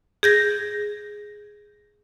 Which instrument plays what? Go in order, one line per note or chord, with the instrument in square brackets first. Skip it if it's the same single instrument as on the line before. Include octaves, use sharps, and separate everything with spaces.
[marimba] G#4 G6 A#6